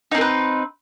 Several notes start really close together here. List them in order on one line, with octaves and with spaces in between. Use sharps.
D#4 C4 A#4 B4